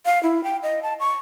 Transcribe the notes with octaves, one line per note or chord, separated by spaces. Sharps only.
F5
E4
G5
D#5
A5
C#6